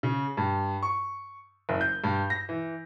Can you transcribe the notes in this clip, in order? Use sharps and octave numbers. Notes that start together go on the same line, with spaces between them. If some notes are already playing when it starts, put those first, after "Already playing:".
C#3
G2
C#6
F#1
G6
G2
A#6
E3